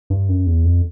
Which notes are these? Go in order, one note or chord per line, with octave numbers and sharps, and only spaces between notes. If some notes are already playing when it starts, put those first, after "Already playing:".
G2
F#2
E2
F2